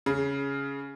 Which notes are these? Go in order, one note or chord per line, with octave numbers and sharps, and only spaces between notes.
C#3